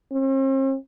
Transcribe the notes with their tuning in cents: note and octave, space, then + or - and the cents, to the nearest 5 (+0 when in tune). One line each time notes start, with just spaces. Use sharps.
C4 +45